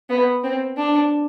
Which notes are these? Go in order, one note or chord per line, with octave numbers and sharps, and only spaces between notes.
B3
C4
D4